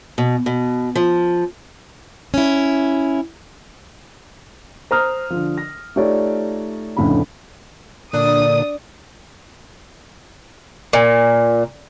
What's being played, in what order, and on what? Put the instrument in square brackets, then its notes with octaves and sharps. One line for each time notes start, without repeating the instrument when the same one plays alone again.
[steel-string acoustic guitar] B2
B2
F3
C#4 E4
[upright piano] C5 A#5 D#6 F6
D3 F3
A#6
A3 D#4 F4 G4 C#5 D5
F1 D2 A2 C#3 C4 B5
[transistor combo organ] A#2 D3 [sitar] D4 [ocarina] D5 [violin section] D#6
[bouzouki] A#2